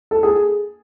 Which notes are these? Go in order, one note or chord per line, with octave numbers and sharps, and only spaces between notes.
A4
G#4